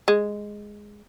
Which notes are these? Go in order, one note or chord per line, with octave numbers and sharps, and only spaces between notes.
G#3